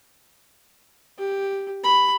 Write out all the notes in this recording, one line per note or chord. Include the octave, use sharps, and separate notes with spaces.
G4
B5